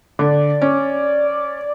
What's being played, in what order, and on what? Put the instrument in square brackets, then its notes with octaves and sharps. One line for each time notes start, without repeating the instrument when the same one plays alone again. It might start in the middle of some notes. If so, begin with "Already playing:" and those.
[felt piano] D3 [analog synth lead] D5
[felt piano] C#4